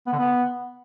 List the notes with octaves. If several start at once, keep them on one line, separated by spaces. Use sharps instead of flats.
B3
D3
B3